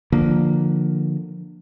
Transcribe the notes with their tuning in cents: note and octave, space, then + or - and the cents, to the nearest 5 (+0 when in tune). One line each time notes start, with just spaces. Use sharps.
D3 +20 F3 +0 A#3 +0